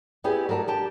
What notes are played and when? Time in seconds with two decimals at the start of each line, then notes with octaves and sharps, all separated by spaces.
0.24 B3 E4 G4 G#4 D5
0.49 F#3 A4 A#4 D5 A5
0.67 D4 G4 A5